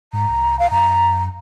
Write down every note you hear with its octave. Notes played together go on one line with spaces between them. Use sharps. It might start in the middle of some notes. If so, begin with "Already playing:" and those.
G#2 A#5
C2
F5
F#2 A#5